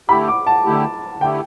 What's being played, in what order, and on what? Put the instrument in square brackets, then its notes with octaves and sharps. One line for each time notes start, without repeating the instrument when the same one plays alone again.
[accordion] D3 A3 E4 G4 [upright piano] B5
[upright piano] D6
A5
[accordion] D3 A3 E4 G4
[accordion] D3 A3 E4 G4 [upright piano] G5